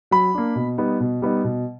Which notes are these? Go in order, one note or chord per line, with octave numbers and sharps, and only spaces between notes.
F#3 B5
A#3 D4
B2
G3 B3 D#4
B2
G3 B3 D#4
B2